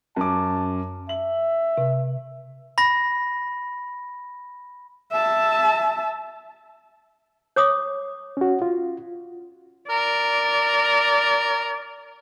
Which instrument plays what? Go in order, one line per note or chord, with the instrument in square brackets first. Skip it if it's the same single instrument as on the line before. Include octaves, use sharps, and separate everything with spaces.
[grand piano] F#2 D6 [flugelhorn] A5
[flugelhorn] E5 [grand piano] F#7
[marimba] C3
[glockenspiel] B5 A#6
[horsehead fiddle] E5 A5
[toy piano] C#5 D6 D#6
[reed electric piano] C#4 F#4
F4
[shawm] A#4 [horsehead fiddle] D5